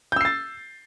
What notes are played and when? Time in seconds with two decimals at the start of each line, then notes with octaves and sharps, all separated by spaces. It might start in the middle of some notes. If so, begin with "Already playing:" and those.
0.12 G6
0.16 E6
0.21 C7
0.25 A6